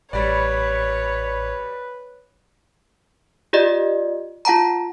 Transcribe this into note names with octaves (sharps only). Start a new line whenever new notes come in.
A1 G3 B4 C#5 D5
F4 G4 D5 D#5
F4 F#5 A5 A#5